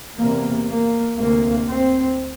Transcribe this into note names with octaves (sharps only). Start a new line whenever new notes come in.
E2 C3 A#3
A#3
D2 C3 A#3
C4